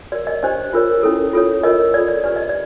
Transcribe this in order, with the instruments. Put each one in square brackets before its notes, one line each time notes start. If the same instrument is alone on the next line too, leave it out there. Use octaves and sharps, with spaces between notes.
[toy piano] F#4 A#4 C#5 D5
D#5
D4 G4 C5 D#5
F4 A#4 C#5
C#4 E4 A4
F4 A4 C#5
F4 A#4 C#5 D#5
F4 A4 C#5 D5
D5
D4 G4 B4 D5
D#5
D5